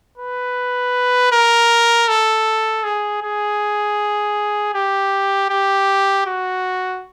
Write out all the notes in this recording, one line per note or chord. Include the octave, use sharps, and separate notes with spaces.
B4
A#4
A4
G#4
G#4
G4
G4
F#4